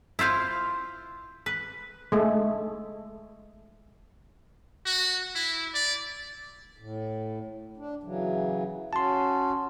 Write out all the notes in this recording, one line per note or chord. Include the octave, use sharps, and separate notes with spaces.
E4 F4 C5 F5
B4
G#3 A3
F#4
E4
D5
A2
D4
C#3 E3 F#3
C#4 F#4 A5 C6